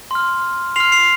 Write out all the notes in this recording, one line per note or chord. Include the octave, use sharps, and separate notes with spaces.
C6 F6
C6 F6 C7 F7
C7 F7